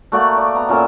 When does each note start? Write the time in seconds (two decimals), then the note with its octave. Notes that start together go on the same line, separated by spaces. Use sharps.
0.12 A3 A#3 F#4 D5
0.37 D5
0.54 B3 A#5
0.69 A#2 C#4 A4 E5